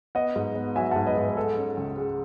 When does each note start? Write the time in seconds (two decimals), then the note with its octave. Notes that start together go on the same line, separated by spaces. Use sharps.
0.15 B3 D#5 F#5
0.36 G#2
0.56 B3
0.76 F#3 E5 G#5
0.91 F#5 A5
0.96 G#2
1.06 B4 D#5
1.17 G#2 B4
1.29 B4
1.36 G#3 A4
1.57 C#4
1.77 C#2
1.97 G#3